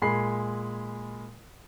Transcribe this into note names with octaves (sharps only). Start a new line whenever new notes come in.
A#2 G#3 G#5 B5 C7